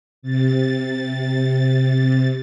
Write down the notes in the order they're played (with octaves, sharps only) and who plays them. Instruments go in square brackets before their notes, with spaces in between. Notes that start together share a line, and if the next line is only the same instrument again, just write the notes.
[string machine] C3 A6